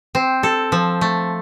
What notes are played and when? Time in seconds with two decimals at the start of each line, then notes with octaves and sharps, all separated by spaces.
0.15 C4
0.43 A4
0.72 F3
1.01 A3